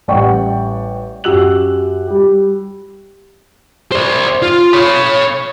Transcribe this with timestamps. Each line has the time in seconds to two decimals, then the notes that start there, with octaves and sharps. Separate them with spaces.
0.08 A1 G3 D5 F#5 G5 C#6
1.24 F#2 F#4 G4 E6 F#6 F#7
2.08 G3 G4
3.92 C5 D5
4.42 F4
4.73 C#5 B5